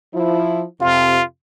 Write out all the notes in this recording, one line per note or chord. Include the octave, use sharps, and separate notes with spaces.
F3 E4
F2 C3 F4